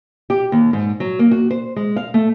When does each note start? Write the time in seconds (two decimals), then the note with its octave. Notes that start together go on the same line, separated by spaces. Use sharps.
0.30 G4
0.52 D#2
0.73 G#2
1.00 F#3
1.19 A#3
1.31 F#4
1.51 C5
1.76 G#3
1.96 F5
2.14 A3